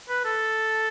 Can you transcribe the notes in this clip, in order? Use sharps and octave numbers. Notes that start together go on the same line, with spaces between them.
B4
A4